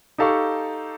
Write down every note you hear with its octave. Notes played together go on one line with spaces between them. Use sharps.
D#4 G4 A4 F5 A5 C#6